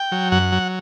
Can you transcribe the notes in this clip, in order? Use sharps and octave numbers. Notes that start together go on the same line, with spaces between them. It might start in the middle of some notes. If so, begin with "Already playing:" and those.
Already playing: G5
F#3
F#2 F#5
F#3